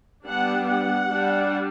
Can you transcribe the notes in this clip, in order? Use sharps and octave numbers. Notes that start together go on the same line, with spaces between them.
G3 B3 D4 F#5
F#5
G3 D4